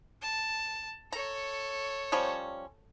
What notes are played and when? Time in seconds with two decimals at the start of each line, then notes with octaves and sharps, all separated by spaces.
0.22 A5
1.12 A4 C#5 A#5
2.12 F3 G3 C#4